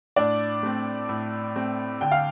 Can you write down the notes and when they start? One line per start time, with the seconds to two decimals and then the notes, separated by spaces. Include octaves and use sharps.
0.16 A2 D4 D5
0.63 A3 C4
1.09 A2
1.55 A3 C4
2.01 D3 G5
2.11 F5